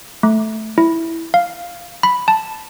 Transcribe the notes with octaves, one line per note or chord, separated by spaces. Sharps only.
A3
E4
F5
B5
A5